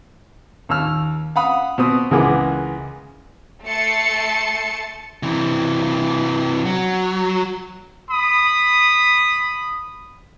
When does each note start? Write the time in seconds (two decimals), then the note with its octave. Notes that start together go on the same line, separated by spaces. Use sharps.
0.69 D#2 E6 F6
1.36 F5 F#5 B5 D#6
1.78 B2 C4 D#6
2.11 C#2 E3 G#3 A#4 F#5 D6
3.66 A3 A5 C6 C#7
5.23 C3 E3
6.65 F#3
8.11 B5 D#6